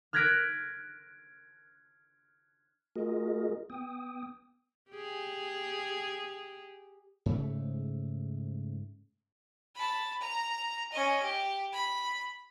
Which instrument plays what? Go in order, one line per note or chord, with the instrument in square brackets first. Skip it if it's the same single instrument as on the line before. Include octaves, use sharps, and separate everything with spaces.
[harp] F6 F#6 G#6 A#6 B6 D7
[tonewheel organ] A3 F4 F#4 G#4 A#4 D#5
B3 G5 D#6
[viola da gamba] G4 G#4
[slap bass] G#2 C#3 A3
[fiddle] A5 B5
A#5
C#4 D#5
G4
B5